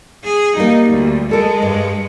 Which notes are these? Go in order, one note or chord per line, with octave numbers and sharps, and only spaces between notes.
G#4
G3 A#3 D#4
D2
G#3 A4 A#4
G2